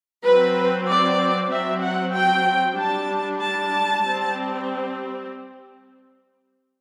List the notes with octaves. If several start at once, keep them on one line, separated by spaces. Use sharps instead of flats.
F#3 C4 B4
D5
F#3 C4 E5
F#5
G5
G3 D4 A5
A5
G3 C4